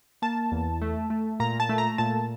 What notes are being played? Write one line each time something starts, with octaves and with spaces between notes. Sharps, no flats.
A#3 A5
E2
A3
A3
A#2 A#5
A5
A3
A#5
A#2 A5